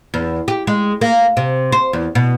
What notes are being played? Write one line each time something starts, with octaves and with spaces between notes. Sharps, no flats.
E2
G4
G#3
A#3
C3
C5
E2
B2